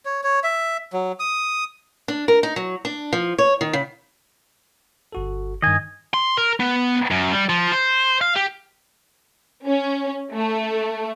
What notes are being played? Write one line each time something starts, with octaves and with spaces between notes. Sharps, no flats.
C#5
C#5
E5
F#3
D#6
D4
A#4
D#4
F#3
D4
F3
C#5
D#3
C#3
G1 F#4 A4
G2 D#3 D#5 G#5
C6
A#4
B3
F#2
G3
F3
C5
F5
G4
C#4
A3